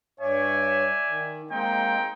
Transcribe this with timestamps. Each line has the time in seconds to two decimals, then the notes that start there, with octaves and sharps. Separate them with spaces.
0.20 G2 C#5 D5 E5 G#5
1.08 D#3
1.51 G#3 A#3 C4 D#4 G5